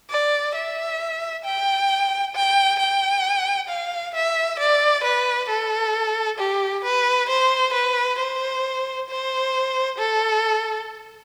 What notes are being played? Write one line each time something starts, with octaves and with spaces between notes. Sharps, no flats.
D5
E5
G5
G5
G5
F5
E5
D5
B4
A4
G4
B4
C5
B4
C5
C5
A4